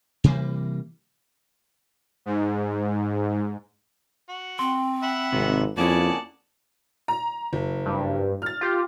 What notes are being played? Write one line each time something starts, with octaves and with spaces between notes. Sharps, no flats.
C3 E3 G3 A#3
G#2
F#4
C4 C6
E5 F#5 B5
G#1 C3 D#4
F2 A#3 C#4 E4 F#4 G#4 D5 A5
A#5
F#1
G2
F6 A6
F4 G4